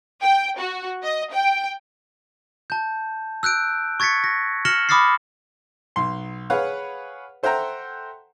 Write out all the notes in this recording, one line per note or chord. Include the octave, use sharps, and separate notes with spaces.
G5
F#4
D#5
G5
A5 G6
E6 F#6 G6 D7
C#6 G#6 A6 B6 C#7
A#6
F6 A#6 C#7 E7 F#7 G7
B5 D6 D#6 F6 A6 C7
B1 C6
G#4 B4 C#5 F5 F#5
A4 C5 E5 F#5 G5 A#5